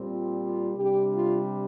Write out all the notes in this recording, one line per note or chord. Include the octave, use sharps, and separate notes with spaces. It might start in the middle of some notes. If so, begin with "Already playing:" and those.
Already playing: A#2 G3 C4
F4
F4
C3 G3 D4 G4
F4